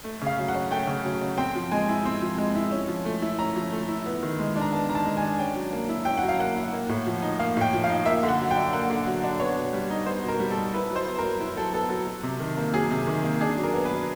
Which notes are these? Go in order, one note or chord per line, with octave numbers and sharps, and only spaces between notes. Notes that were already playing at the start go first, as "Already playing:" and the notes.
A3
C#3 F5
F#3
F#5
C#4
A3 G5
C#3
F#3
C#4
C4 G5
F3
G#3 G#5
E4
C4
F3
G#3
E4
C#4
F3
A3
E4
C#4 A#5
F3
A3
E4
B3
D#3
G#3
D4
A#5
B3 A5
D#3 A#5
A5
G#3
G#5
D4
C#4 G5
F#3
A#3
E4
C#4 G5
F#3 F#5
F5
A#3 F#5
E4
A#3
A2
F3
D#4
A#3 F5
A2 G5
F3
F5
D#4
A#3 E5
D3
F#5
F#3
G5
D4
A#3 F#5
D3
F#3
D4
B3 C#5
B2
G3
D#4
B3 C5
B2 A#4
G3
A4
D#4
E4 B4
F#3
C5
B3
F#3 A#4
E4
F#3 A4
B3 A4
F#3 A4
F#3
C3
D#3
A#3
F#3 G#4
C3
D#3
A#3
D4 G#4
F#3
A#4
B3
B4
F#3